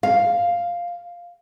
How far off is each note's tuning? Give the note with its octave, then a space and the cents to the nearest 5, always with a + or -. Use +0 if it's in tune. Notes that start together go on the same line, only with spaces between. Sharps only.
F5 +0